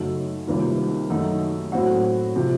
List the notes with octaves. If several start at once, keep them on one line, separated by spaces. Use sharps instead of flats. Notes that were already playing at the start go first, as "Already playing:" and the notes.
Already playing: F#2 C#3 A3 D#4 F#4
C2 C3 D#3 A#3 F4
F#2 D#3 A3 D#4 F#4
A2 F#3 C4 F#4
C3 F3